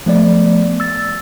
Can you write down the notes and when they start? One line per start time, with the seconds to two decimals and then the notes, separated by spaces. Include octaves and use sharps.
0.06 F3 A3 B3 D5
0.80 E6 A6